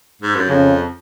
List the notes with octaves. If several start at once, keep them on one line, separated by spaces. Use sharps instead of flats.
G#2
F#2
F2 C#3